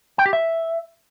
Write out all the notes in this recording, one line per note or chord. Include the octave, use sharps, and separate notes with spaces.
G5
G4
E5